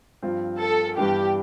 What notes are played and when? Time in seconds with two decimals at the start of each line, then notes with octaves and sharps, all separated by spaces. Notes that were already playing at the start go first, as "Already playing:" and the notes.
0.23 G2 F3 C4 F4
0.60 A4
0.97 G2 E3 G3 B3 D4 G4